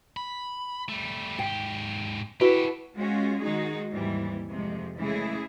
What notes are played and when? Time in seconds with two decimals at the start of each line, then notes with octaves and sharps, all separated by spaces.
0.17 B5
0.89 G3 A3
1.39 G#2 G4 G5
2.41 E4 F#4 G4 A4 B4
2.97 G#3 C#4 F4 F#4
3.40 D#3 G#3 D#4 F#4 G#4
3.92 D#2 G#2 E3 G3 C4
4.49 F2 C3 G#3
4.98 C#3 E3 G#3 A3 E4 G#4